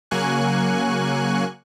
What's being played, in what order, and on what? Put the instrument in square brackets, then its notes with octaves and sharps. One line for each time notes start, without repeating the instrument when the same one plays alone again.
[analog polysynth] C#3 F#3 A#3 G#5 C#6 F#6